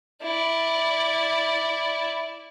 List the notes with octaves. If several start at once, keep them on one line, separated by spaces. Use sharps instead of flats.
E4 D5